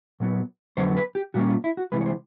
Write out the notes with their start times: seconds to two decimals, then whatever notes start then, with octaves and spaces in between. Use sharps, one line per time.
0.20 A#2 F#3 B3
0.77 F2 D3 F#3 B3 C5
0.97 B4
1.15 G4
1.34 A#2 G3 A#3 C#4 F#4
1.49 F4
1.64 E4
1.77 F#4
1.92 C2 C3 E3 G#3 B4
2.01 C#5
2.06 C5